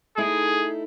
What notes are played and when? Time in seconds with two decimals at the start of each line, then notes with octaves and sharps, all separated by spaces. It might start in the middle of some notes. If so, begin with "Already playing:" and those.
0.18 A3 D#4 E4 G#4